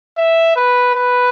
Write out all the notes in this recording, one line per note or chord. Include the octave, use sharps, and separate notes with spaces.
E5
B4
B4